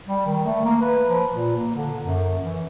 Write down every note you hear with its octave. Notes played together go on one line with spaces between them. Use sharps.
G3
D#3
A3
A#3
B4
F3
A#2
A#3
D3
F#2
E3